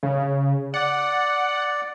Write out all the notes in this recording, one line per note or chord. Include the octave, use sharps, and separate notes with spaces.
C#3
D5 F#5